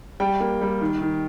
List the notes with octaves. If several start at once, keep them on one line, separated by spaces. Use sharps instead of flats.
G3 G5
A#3
G3
D#3
D#3